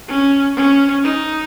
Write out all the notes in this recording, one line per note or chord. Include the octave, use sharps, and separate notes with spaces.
C#4
C#4
D#4